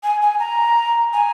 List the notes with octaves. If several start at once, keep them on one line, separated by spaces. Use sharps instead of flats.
G#5
G#5
A#5
G#5